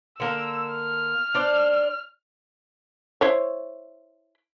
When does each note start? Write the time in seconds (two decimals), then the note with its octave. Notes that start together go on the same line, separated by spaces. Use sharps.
0.20 D3 A#3 A#4 E6
0.73 F6
1.35 D4 C5 D5
3.21 E4 C5 C#5